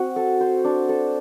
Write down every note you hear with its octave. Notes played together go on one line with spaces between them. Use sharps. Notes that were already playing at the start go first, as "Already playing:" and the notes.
Already playing: C4 F#4
A4
C5
D4
A4